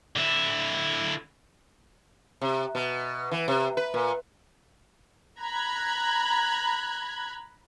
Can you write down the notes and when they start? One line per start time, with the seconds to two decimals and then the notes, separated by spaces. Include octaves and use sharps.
0.16 D3 E4
2.41 C3
2.75 B2
3.31 E3
3.48 C3
3.77 B4
3.94 A#2
5.40 A#5 B5 F#6 G#6